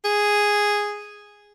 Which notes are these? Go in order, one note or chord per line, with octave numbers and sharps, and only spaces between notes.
G#4